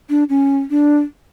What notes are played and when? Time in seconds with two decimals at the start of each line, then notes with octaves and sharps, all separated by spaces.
0.10 D4
0.29 C#4
0.70 D4